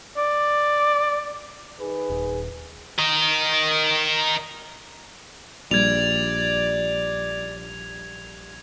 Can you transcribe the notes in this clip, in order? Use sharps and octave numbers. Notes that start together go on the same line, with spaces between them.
D5
D#3 G#4 B4
D#1
A#4 D#5
A#1 G3 D5 G#6 F7